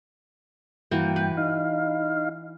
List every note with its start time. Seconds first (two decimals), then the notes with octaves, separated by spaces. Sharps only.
0.91 G2 E3 A#3 F#4 G5
1.16 B4
1.37 D#4 F5